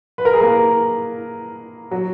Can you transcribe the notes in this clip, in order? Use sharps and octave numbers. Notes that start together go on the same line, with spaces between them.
B4
A#4
G#4
A#3 A#4
F#3 F#4